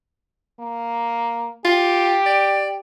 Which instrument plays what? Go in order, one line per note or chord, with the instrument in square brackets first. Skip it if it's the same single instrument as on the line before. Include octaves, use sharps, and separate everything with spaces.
[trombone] A#3
[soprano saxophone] F4 [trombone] G4
[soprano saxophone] D5